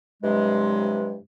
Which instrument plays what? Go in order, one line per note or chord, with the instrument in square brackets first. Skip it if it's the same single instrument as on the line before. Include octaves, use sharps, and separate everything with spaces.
[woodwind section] G2 C3 E3 F#3 G#3